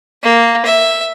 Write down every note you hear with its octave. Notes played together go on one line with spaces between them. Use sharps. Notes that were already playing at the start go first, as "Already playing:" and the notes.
A#3
E5